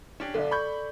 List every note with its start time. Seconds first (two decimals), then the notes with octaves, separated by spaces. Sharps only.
0.20 C#4 D4 G4
0.34 B1 D3 A4 D5
0.51 B5 C#6 G6